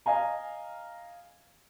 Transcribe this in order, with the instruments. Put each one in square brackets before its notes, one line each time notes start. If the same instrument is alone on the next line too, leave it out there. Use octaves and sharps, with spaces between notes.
[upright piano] D#5 F5 G#5 A#5